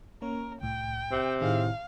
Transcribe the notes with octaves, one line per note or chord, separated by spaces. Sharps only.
A#3 C#4 A#4 C#5
C2 A2 G5
C3
A2 D#3 D#4 G#4 F5